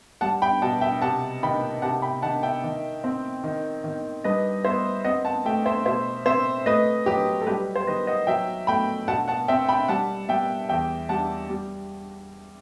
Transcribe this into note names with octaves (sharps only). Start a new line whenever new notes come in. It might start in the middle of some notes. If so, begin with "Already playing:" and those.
G3 F#5 A5
G5 B5
B2 F#5 A5
E5 G5
C3 F#5 A5
D#3 G5 B5
C3 F#5 A5
G5 B5
D#3 F#5 A5
E5 G5
D#3
C4
D#3
D#3
G2 B4 D#5
B3 C5 E5
C4 D#5 F#5
F#5 A5
A3 E5 G5
C5 E5
B2 C5 E5
C4 C5 E5
A3 B4 D#5
F#3 G4 B4
A4
G3 G4 B4
C5
D#3 B4 D#5
D#5 F#5
F#3 E5 G5
A3 G5 B5
B2 F#5 A5
F#5 A5
C4 E5 G5
G5 B5
G3 F#5 A5
G3 E5 G5
E2 E5 G5
G3 F#5 A5
G3